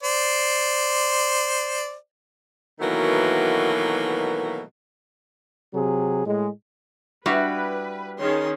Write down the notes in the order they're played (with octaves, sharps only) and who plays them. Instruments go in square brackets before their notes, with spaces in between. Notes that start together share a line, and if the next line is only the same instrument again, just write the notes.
[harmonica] C5 D5
[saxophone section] B2 D#3 E3 F#3 A3 A#3
[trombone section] C3 F#3 G#4
A2 G#3
[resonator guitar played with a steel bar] G3 D4 E4 [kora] F#4 [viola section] B4
[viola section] D#3 C#4 G#4 [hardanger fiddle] C#5 C6